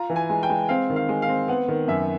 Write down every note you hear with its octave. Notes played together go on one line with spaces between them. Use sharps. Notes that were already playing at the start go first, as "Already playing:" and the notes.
Already playing: F4 A#5
E3
G#5
G#3
G5
G#3
C4 F5
D#3
F5
G#3
F5
C4
B3 F#5
D#3
F#2 E5